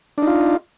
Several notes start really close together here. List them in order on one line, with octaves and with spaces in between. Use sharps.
D4 D#4 F4